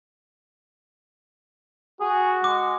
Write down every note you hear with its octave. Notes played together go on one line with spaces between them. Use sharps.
F#4 G#4
G#3 D6